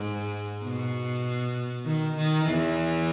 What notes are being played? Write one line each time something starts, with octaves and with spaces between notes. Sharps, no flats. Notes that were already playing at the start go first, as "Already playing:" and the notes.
Already playing: G#2
B2
D#3
D#3
E2 E3